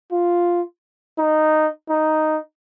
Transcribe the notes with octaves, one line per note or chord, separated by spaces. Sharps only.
F4
D#4
D#4